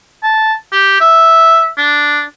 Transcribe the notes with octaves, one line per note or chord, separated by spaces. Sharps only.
A5
G4
E5
D4